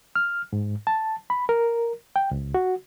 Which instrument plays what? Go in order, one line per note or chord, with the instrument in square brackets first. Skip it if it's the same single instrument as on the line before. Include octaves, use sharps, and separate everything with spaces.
[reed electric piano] F6
G#2
A5
B5
A#4
G5
C#2
F#4